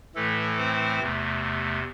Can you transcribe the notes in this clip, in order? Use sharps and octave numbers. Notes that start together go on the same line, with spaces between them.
A2 E3 A3 A4
C4 C5
E2 C3 A3